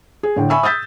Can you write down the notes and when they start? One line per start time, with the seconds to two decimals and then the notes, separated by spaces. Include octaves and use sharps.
0.23 G#4
0.36 A2 D3 G5
0.50 E5 G#5 B5 C#6 E6
0.63 D#6 E6 G6 A6 B6